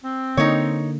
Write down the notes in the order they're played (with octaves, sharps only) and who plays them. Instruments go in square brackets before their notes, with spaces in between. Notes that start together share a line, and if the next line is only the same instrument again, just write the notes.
[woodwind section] C4
[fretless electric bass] D3 A#3 [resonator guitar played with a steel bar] D#4 C#5